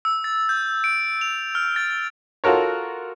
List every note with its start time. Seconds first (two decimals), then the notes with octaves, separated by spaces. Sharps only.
0.05 E6
0.24 A6
0.49 G6
0.84 D7
1.21 F7
1.55 F6
1.76 A6
2.44 F4 F#4 A4 A#4 C#5